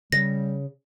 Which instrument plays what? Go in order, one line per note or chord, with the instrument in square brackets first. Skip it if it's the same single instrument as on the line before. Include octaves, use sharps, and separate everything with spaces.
[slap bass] C#3 [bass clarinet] G3 [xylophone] A#6